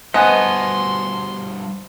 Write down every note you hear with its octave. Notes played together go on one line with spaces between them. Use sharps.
G2 B2 B3 C5 D#5 G#5 C6